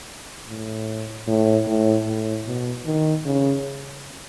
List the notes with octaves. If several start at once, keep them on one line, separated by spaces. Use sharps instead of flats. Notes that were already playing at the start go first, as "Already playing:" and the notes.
A2
A2
A2
A2
B2
D#3
C#3